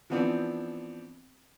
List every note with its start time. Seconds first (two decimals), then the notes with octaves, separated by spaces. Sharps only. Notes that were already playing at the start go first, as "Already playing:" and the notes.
0.10 E3 F3 B3 C4 D4